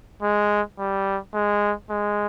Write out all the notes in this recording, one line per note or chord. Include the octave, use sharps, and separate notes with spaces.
G#3
G3
G#3
G#3